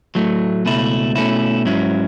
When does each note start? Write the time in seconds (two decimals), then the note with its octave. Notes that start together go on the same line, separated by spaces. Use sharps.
0.15 A2 F#3 A3
0.65 C#2 B2 A3 E4
1.16 B2 A3 C#4 E4
1.65 G#2 F#3 C#4 E4